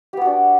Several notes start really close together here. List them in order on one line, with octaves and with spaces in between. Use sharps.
G4 B3 F#4 D4